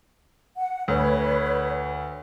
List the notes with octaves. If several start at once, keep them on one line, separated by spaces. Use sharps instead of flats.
F#5
D2 B4 C#5